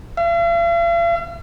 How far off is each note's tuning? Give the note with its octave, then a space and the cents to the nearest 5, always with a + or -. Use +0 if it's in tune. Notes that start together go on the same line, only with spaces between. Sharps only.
F5 -45